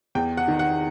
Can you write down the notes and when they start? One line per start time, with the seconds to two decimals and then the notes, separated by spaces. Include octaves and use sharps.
0.15 E2 G5
0.37 F#5
0.48 D#3
0.59 F#5